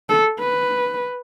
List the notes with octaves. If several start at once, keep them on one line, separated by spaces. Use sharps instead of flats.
A4
B4